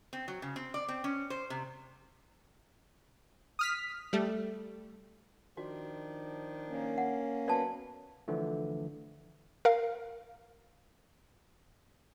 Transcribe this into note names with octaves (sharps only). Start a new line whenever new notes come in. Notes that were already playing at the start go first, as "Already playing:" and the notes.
C4
F#3
C#3
C4
D5
C4
C#4
C5
C3
D#6 F6 B6
G3 A3
D#3 F3 D4 F#4
A#3 C#4
F#5
F#3 B3 D5 A5
D3 E3 F3 A3
A#4 F5